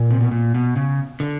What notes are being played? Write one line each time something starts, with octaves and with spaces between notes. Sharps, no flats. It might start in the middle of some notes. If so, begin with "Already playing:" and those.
Already playing: A#2
C3
B2
A#2
B2
C#3
D3